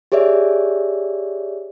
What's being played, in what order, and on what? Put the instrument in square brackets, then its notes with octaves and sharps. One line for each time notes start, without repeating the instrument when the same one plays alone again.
[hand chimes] G4 G#4 C#5 D5 E5